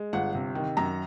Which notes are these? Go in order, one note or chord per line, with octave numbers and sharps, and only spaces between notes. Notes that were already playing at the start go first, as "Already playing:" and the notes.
Already playing: G#3
G1 F#5
C3
D#3
F#2 A#5